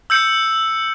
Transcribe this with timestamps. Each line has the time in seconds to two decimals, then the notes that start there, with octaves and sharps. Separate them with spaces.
0.10 E6 G6 C#7